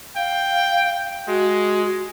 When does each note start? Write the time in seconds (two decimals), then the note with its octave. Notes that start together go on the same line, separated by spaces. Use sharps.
0.16 F5 G5
1.28 G#3 F#4